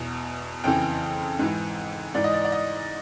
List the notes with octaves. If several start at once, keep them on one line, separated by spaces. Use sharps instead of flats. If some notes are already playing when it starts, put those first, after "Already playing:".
Already playing: E2 B2
F2 C#3 E3 G5
G#2 E3
G#2 E3 D5
D#5
D5
D5
D#5